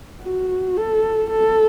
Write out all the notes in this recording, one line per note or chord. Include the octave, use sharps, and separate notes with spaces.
F#4
A4
A4